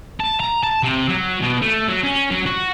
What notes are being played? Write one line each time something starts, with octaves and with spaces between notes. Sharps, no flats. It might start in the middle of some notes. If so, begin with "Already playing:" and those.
A5
A#5
A5
C3
F#3
B2
A3
F#3
C#4
F#3
F#4